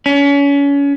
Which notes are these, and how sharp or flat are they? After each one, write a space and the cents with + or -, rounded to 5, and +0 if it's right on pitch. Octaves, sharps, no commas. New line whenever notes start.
C#4 +30